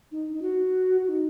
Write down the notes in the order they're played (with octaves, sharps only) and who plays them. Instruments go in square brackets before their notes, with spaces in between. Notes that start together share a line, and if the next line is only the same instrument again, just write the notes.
[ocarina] D#4
D#4
F#4
F#4
D#4